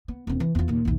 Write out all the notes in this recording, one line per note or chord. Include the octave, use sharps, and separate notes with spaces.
B3
E1 C4
E3
E2 F4
D#2 A#2
B1 E2